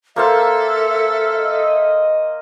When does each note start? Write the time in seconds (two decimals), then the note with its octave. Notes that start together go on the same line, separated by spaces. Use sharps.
0.16 A#3 A4 C5 E5 F5
1.36 D#5